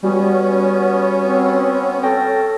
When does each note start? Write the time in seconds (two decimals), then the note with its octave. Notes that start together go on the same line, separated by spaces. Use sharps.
0.03 G3 B3 C#4 F#4
1.21 C4
2.03 A4 C#5 G5 A#6